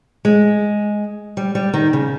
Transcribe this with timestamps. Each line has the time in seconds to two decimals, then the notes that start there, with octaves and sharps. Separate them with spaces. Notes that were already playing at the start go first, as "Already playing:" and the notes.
0.25 G#3
1.37 G3
1.55 G3
1.73 D#3
1.93 C#3